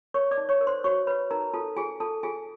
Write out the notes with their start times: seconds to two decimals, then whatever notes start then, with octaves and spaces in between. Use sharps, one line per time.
0.14 A#4 C#5 C#6
0.31 D5 D6
0.38 D#4
0.49 C#5 C#6
0.61 A#4
0.67 C5 C6
0.84 F#4 C#5 C#6
1.07 B4 C#5 B5
1.31 D#4 A#4 A#5
1.54 F4 A4 A5
1.76 F4 G#4 G#5
2.00 F4 A4 A5
2.23 F4 G#4 G#5